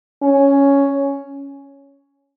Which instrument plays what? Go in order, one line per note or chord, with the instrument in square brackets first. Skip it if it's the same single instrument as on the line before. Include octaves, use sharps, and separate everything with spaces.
[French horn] C#4